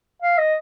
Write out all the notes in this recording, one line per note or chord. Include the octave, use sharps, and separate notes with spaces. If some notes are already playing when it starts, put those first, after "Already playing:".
F5
D#5